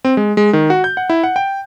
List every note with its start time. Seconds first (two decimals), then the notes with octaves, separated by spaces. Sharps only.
0.05 C4
0.17 G#3
0.37 G#3
0.53 D#3
0.70 F#4
0.84 G6
0.97 F#5
1.10 E4
1.24 F#5
1.36 G5